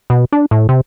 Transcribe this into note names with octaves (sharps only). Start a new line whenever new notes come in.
B2
D4
A2
C3